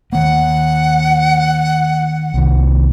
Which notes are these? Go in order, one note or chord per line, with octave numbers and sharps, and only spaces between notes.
D#3 A#3 F#5
C2 D#3